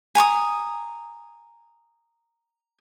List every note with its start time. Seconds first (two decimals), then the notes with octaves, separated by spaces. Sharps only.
0.15 G#5 A#5 C#6 D#6